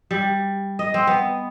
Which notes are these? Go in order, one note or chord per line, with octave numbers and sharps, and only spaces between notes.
G3
D#5
C4
B3